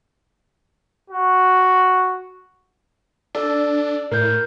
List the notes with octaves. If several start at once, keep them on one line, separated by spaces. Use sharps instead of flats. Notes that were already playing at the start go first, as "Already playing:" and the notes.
F#4
D4 A4 D5
A2 A#4 G6